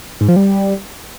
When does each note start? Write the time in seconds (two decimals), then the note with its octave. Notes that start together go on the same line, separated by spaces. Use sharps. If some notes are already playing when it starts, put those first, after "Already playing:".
0.21 G#2
0.29 F3
0.36 G3